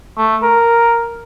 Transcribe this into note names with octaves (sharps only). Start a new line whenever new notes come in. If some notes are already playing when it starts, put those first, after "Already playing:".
A3
A#4